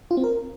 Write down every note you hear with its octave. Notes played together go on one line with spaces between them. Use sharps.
F4
C4
A#4